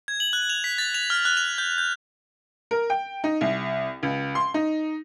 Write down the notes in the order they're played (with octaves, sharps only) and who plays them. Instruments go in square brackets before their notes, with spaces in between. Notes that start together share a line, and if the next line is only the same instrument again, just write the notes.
[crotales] G#6
F#7
F#6
F7
B6
A6
F7
F6
F#6
F7
G6
G6
[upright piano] A#4
G5
D#4
C2
C#2
C6
D#4